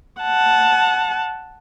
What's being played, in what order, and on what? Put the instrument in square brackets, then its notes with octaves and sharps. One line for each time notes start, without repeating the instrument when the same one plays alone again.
[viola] F#5 A5